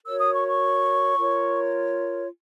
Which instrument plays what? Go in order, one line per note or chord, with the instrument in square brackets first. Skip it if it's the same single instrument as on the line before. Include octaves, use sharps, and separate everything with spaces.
[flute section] F#4 A#4 C#5 E6
D#6
C#6
C#6
F4 A#4 C#5